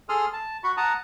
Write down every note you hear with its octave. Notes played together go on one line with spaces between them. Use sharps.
G#4 A4 C6 D#6 F6
A5
F#4 B5 C#6
F#5 A5 A#5 D#6